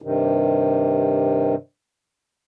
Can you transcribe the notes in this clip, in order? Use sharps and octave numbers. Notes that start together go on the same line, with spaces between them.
G2 C3 D#3